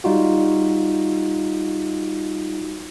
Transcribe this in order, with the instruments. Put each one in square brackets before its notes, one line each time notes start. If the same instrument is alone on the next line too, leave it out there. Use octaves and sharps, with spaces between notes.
[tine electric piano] G3 D#4 F4 F#4